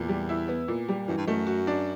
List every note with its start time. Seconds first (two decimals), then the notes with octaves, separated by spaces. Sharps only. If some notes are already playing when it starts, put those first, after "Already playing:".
Already playing: E2 A#2
0.09 G3
0.29 E4
0.48 B3
0.68 A#2
0.88 G3
1.08 F#2 E3
1.17 G2
1.27 F#2 A3
1.47 F#4
1.67 D4